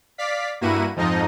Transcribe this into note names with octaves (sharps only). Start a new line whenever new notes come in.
D5 F5 B6
G2 A#3 E4 F#4 D#7
F2 G#2 F3 D#4 D#5